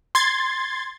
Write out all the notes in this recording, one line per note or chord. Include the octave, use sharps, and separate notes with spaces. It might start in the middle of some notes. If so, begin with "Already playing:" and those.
C6 G#6 A6